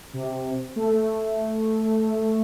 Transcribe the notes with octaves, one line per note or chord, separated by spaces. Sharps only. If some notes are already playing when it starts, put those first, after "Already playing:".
C3
A3